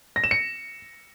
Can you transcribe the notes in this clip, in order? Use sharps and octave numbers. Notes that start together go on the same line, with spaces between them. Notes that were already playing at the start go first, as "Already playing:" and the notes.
A#6
E7
C#7